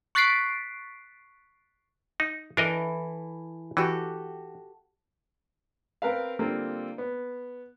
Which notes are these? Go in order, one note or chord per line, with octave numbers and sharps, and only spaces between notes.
C#6 F#6 A6 B6 C7 D7
D#4
E3 D4 E4 A4 A#4 D#5
E3 F#4 G4 A4
C4 A#4 B4 F5
D3 G3 A#3 C4 F4 A4
B3